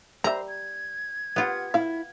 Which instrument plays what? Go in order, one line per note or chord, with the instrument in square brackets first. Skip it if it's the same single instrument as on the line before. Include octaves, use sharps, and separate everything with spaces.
[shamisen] G3 E5 [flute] C5 [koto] A#5
[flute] G#6
[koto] B3 F4 [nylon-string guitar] G4 F#5
[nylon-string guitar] E4 E5 [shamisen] F5